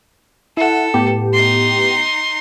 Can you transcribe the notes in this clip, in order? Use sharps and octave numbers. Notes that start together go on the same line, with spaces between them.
E4 A4 F#5
A2 B3 G4
D#4 C6